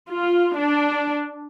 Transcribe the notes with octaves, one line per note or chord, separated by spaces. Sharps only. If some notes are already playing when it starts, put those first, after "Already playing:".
F4
D4